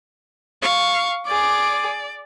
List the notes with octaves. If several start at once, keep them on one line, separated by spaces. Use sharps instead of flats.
F5 C#6
G#4 D5 D6